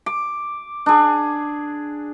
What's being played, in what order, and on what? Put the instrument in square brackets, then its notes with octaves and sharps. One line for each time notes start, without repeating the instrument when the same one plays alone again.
[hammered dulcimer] D6
D4 G#4